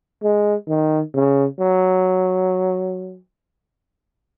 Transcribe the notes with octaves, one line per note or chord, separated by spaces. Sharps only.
G#3
D#3
C#3
F#3